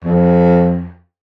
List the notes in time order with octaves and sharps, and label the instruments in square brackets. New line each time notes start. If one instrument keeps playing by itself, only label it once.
[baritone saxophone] F2